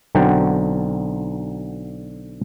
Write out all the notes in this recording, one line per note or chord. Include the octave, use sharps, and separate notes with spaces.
B1 D3 F#3 C4 F#5 G5